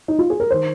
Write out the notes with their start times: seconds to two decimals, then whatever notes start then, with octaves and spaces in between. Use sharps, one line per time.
0.08 D#4
0.19 F4
0.30 G#4
0.40 A#4
0.50 D#3 C5